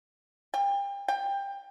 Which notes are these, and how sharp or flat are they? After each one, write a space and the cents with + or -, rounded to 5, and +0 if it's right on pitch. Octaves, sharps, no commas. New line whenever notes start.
G5 +35
G5 +20